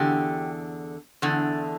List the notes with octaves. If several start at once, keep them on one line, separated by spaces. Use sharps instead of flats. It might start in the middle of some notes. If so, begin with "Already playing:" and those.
Already playing: E2 D3 G4
E2 D3